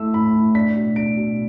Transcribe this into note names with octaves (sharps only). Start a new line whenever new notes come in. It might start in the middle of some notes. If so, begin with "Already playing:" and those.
Already playing: A3 E4 E6
A2 B5
A2
D4 B6
B2
D4 D7
B2